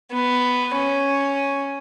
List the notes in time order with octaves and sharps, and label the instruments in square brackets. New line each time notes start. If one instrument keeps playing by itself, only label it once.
[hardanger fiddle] B3
C#4